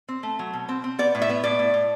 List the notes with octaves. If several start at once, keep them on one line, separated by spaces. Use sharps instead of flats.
C4
A3
F#3
B2
C4
C4
B3 D5
A2
E5
B3
A2 D5
A2
A2